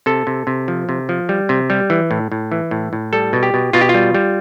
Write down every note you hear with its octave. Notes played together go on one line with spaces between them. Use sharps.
C3 A4
C3
C3
F3
C3
F3
G3
C3
G3
E3
A2
A2
E3
A2
A2
G3 A4
B2
G4
B2
B2 F4
G4
F4
G3
G3